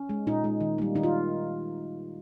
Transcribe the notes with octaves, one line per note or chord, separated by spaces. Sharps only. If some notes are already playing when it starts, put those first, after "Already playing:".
Already playing: C#4
G#3
A#2 D#4
G#3
D#3
G3 A#3
D#3 D#4
F4